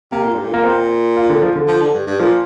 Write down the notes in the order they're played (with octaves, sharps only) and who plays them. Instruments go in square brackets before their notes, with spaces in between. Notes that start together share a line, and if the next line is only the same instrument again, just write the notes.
[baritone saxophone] C3 [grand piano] A#3
[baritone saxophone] A#2
G2
A#2
[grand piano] A#3
C4
F4
D3
F3
D3
[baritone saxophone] F3
D3
G2
G2
[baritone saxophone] A#2 [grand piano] F3